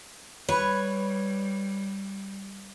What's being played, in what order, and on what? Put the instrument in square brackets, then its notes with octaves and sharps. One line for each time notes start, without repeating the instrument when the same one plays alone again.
[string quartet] G3 [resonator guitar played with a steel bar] B4 [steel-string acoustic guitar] C#5